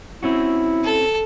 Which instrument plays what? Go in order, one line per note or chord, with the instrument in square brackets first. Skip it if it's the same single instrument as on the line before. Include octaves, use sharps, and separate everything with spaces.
[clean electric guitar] C4 C#4 F#4 [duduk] E4
[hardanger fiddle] A4